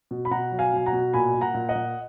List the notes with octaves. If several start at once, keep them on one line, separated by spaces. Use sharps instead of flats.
B2
B5
B2 F#5 A#5
F#3
F5 G#5
B2 G#5
F#5 A#5
B2
A#2 G#5 B5
A#2
F#5 A#5
A#2
D#5 F#5
A#2